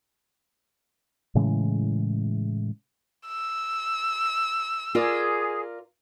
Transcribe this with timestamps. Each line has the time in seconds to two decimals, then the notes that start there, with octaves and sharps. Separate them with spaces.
1.35 A2 C#3 E3 G#3
3.28 E6
4.95 F4 G#4 A#4 D5